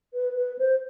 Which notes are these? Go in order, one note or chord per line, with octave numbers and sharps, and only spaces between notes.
B4
B4
C5